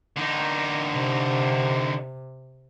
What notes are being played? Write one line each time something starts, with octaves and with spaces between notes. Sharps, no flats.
D3 D#4
C3